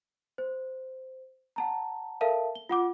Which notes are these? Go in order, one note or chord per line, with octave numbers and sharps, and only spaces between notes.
C5
F#5 A5 A#5
A4 A#4 E5 F5 A5
G7
F4 F#5 D6